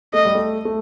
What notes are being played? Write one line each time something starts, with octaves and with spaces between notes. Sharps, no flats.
A3 D#5
G3
A3
A3